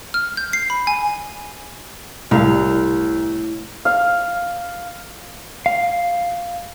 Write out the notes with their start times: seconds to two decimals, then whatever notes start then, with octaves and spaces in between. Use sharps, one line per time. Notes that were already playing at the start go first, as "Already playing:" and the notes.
0.14 F6
0.37 G6
0.53 C7
0.70 B5
0.87 G#5
2.31 C2 A2 F5
3.85 F5
5.66 F5